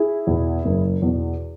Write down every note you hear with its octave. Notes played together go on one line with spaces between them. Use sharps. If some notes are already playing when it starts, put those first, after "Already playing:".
Already playing: E4 G#4
E2 B2
F#1
E2 B2